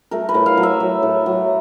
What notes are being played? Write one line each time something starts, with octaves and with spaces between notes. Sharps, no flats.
A3 A#4
B4
A2
F5
F#3
E5
F#3
A2
F#3